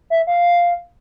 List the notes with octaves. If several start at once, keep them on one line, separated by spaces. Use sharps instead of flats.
E5
F5